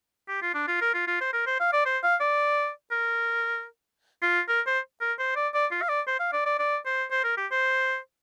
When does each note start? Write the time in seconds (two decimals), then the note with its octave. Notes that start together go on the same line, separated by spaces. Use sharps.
0.28 G4
0.42 F4
0.54 D4
0.68 F4
0.81 A#4
0.94 F4
1.07 F4
1.21 C5
1.33 A#4
1.47 C5
1.60 F5
1.73 D5
1.86 C5
2.03 F5
2.20 D5
2.91 A#4
4.22 F4
4.48 A#4
4.67 C5
5.01 A#4
5.19 C5
5.36 D5
5.54 D5
5.71 F4
5.82 F5
5.89 D5
6.07 C5
6.19 F5
6.33 D5
6.46 D5
6.59 D5
6.86 C5
7.11 C5
7.24 A#4
7.37 G4
7.51 C5